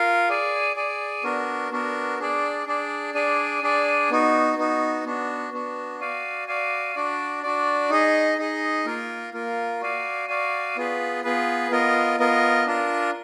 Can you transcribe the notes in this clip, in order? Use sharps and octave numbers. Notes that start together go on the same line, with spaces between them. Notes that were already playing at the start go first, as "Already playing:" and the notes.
Already playing: F4 A#4 F5
G#4 D5 G#5
G#4 D5 G#5
B3 D4 F#4 A#4
B3 D4 F#4 A#4
D4 G#4 D5
D4 G#4 D5
D4 G#4 D5 G#5
D4 G#4 D5 G#5
B3 D#4 F#4
B3 D#4 F#4
B3 D4 F#4
B3 D4 F#4
F#4 D5 F5 G#5
F#4 D5 F5 G#5
D4 F#4 D5
D4 F#4 D5
D#4 G#4 D#5
D#4 G#4 D#5
A#3 F4 A#4
A#3 F4 A#4
F#4 D5 F5 G#5
F#4 D5 F5 G#5
B3 F4 G#4 B4
B3 F4 G#4 B4
B3 F4 A#4 D#5
B3 F4 A#4 D#5
D4 F4 A#4